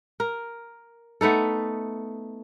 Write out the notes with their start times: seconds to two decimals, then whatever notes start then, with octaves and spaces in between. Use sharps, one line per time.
0.20 A#4
1.21 A3 B3 D#4 A4